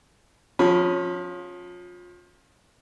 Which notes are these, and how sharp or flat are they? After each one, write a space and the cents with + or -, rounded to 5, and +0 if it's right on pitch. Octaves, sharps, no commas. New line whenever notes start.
F3 +25 C#4 -15 B5 +0